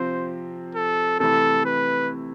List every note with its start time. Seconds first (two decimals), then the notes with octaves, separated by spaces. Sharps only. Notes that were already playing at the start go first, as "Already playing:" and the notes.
Already playing: C3 F3 C4 C5
0.75 A4
1.20 C3 E3 A3 E4 A4
1.65 B4